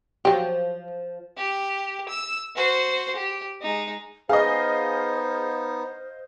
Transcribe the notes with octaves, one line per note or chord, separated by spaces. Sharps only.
F3 F#3 G4
G4
E6
F#4 C5
G4
G#3 D#4
B3 D#4 G#4 C5 D#5 F5